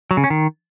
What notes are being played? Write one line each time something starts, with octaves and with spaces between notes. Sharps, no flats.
F#3
C#3
C#4
D#3